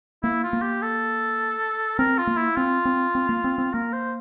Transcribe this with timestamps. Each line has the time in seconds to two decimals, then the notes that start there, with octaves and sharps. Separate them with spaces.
0.23 A#3 E4
0.43 F4
0.53 A#3
0.62 G4
0.82 A4
1.98 C4 A#4
2.18 F4
2.27 A#3
2.37 E4
2.56 C4 F4
2.85 C4
3.15 C4
3.29 A#3
3.44 C4
3.58 C4
3.74 A#3 A#4
3.93 C5